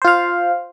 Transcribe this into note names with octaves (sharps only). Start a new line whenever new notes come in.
F4 C5 F5